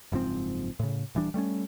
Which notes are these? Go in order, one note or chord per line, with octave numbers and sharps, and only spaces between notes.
F#1 G#2 F3 C4
A2 C#3
D#1 E3 G3 D4
G3 A3 C4 C#4